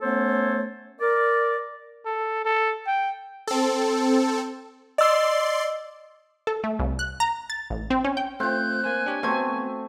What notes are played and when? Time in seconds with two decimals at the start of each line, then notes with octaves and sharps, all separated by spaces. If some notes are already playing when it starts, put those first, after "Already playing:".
0.01 A3 B3 C#4 A4 C5 C#5
1.00 A#4 D5
2.06 A4
2.45 A4
2.87 G5
3.47 C4 A4
4.98 D5 D#5 C6 E6
6.47 A4
6.64 A3
6.79 C2
6.99 F#6
7.20 A#5
7.50 A6
7.70 A1
7.90 C4
8.04 C#4
8.17 G5
8.40 A3 C4 F4 F#6 G6
8.84 A#3 C5 G#5
9.06 D4 G4 C#5
9.23 A3 B3 C4 F#4 G#6